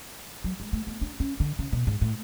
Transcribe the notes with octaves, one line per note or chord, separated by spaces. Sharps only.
F#3
G#3
A3
B3
D4
C#4
D3
C#3
B2
G#2
A2